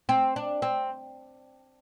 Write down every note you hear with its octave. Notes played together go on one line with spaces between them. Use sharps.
C4
D4
C4